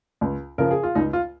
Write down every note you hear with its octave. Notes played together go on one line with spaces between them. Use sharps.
C#2
C#3 F3 A#4
G#4
F4
C#2 D#4
F4